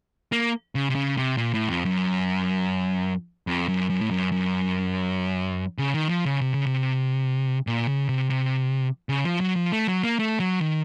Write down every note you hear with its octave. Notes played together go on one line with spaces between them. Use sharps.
A#3
C#3
C3
C#3
C3
A#2
A2
F2
F#2
F2
F#2
F#2
A2
F#2
F#2
C#3
D#3
F3
C#3
C3
C#3
C3
A#2
C#3
C3
C3
C#3
F3
F#3
F3
A3
F#3
A#3
A3
F#3
D#3